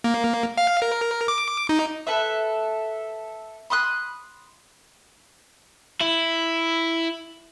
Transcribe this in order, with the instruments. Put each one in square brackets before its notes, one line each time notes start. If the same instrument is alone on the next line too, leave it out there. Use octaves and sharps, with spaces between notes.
[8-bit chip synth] A#3
F5
A#4
D6
D#4
[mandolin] A4 B4 E5
B5 C6 D#6 F#6
[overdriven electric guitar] E4